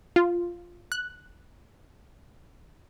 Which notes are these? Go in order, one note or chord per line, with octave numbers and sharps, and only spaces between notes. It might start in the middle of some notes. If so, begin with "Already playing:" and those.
F4
F#6